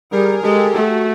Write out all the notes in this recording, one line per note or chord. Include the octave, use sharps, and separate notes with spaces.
G3 G#4 A#4
G#3 G4 A4
A3 F#4